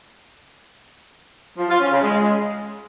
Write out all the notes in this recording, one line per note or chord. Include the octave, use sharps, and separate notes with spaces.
F3
F4
C#4
C#3
G#3